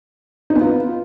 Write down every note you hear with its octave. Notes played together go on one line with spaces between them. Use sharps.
D#4
B3
F4